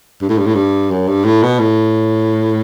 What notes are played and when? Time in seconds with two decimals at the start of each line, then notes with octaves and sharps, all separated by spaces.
0.22 G2
0.29 A2
0.38 G2
0.47 A2
0.55 G2
0.91 F#2
1.08 G2
1.25 A2
1.43 B2
1.60 A2